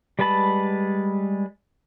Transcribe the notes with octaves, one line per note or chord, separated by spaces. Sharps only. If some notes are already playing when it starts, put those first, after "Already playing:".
G3 G#3 B4 A5 B5